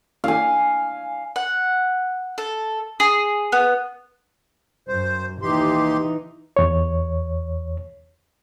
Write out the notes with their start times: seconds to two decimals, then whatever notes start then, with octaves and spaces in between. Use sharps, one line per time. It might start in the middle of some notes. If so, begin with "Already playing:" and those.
0.24 F5 G#5
1.36 F#5
2.38 A4
3.00 G#4
3.52 B3
4.88 F#2 C5
5.42 D#2 E3 D#4 G4 C6
6.57 E2 C#5